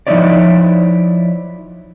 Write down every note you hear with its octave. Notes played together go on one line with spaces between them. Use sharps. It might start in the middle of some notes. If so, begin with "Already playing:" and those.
F3 A3 D#4 E4 C#5 D5